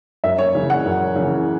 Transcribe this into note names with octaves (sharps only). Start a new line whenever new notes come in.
F#2 E5
C#5
C#3 E3
F#5
F#2
C#3 E3